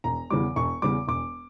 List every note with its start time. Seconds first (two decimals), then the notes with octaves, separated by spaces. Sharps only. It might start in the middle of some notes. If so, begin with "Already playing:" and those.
0.04 E1 A#5
0.30 E2 C#3 E3 G3 D6
0.56 E1 C#6
0.82 E2 C#3 E3 G3 D6
1.07 E1 D6